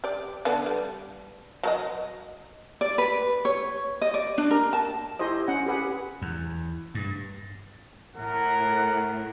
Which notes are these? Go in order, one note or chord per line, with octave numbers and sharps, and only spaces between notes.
G4 D5
D3 B3 D4
G3
F#3 A#4 D#5
D5
B4
C#5
D#5
D5
D4
A#4
A5
E4 G4 C5 D#5
C#4 F#5
G4 G#4 B4 F#5
E2
G2
A2 A#4 F#5